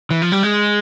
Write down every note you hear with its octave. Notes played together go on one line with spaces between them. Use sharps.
E3
F3
G3
G#3